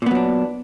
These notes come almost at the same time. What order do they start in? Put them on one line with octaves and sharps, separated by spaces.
A#2 B3 F#3 D4